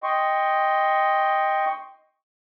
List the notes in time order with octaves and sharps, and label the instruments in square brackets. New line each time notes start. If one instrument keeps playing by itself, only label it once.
[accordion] D#5 G5 C6 C#6